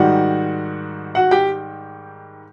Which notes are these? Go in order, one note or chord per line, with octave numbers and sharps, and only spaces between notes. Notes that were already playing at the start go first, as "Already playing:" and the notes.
Already playing: G#2 D#3 G3 F#4 F#5
F#4 F#5
G4 G5